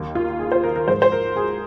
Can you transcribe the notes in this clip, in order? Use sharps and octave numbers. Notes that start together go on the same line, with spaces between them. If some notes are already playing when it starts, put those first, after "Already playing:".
Already playing: D#2 D#3 A#3
F4
G#4
C5
A#4
A#4
G#2 F3 G#3 C5
C5
A#4
G#4